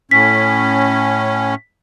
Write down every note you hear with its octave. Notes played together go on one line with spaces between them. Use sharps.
A2 C#4 B6